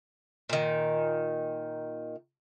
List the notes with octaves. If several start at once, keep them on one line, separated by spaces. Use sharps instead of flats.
A#2 D#3